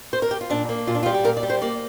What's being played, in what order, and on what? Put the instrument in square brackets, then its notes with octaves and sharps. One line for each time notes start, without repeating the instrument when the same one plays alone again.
[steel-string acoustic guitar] C5
A#4
G4
F4
A#2 D4
A#3
A#2 F4
D4
F4
G3
G4
A#2 A#4
D5
G3
C5
A#3 D5